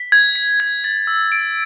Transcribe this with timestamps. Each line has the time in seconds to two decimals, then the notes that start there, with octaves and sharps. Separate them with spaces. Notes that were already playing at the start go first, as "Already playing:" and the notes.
Already playing: B6
0.12 G#6
0.36 B6
0.60 G#6
0.84 A6
1.07 E6
1.32 D7